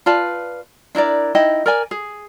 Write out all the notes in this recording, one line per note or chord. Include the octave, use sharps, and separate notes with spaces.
F4 B4 D5 A5
D4 E4 A#4 D5
D#4 E4 D#5 G5
A#4 D5 G#5
G#4